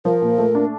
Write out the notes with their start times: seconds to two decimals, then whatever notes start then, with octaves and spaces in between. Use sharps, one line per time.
0.05 F3 A#4
0.22 A#2
0.38 A3
0.55 D4